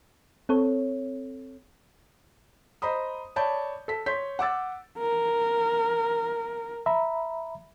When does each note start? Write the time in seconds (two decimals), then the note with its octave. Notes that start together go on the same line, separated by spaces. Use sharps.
0.49 C4 A4 C#5
2.82 C5 D#5 A#5 B5 D#6
3.36 C#5 D5 A5 B5 G6
3.88 A4 B6
4.06 C#5 C6 G6 B6
4.39 F#5 D6 E6 A6
4.98 A#4
6.86 E5 A#5 B5